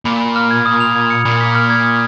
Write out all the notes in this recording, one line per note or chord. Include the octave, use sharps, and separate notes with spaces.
A#2 B5
B5
F6
G#6
D#6
F7
G#6
C#7
A#2 B5
B6
F6
G#6
D#6